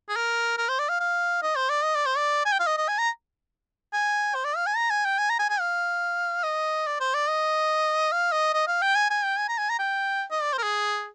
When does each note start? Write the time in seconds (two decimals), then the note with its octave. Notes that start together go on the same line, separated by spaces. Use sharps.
0.09 G#4
0.16 A#4
0.58 A#4
0.69 C5
0.79 D5
0.89 F5
1.00 F5
1.42 D#5
1.56 C5
1.69 D5
1.83 D#5
1.95 D5
2.06 C5
2.17 D5
2.45 G#5
2.52 G5
2.60 F5
2.67 D#5
2.77 D#5
2.88 G#5
2.98 A#5
3.93 G#5
4.35 C5
4.45 D5
4.56 F5
4.67 G#5
4.76 A#5
4.90 G#5
5.05 G5
5.19 G#5
5.30 A#5
5.39 G#5
5.50 G#5
5.60 F5
6.44 D#5
6.87 D5
7.00 C5
7.14 D5
7.29 D#5
8.12 F5
8.32 D#5
8.54 D#5
8.67 F5
8.82 G5
8.95 G#5
9.10 G#5
9.24 G5
9.37 G#5
9.49 A#5
9.58 G#5
9.69 A#5
9.79 G5
10.31 D#5
10.42 D5
10.53 C5
10.58 A#4
10.63 G#4